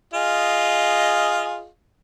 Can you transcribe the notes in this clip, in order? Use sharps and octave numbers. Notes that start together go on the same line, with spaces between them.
F4 G#4 D#5